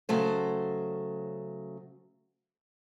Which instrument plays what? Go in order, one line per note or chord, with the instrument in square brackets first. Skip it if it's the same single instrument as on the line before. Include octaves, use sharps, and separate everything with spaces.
[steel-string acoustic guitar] C#3 F#3 A3 C5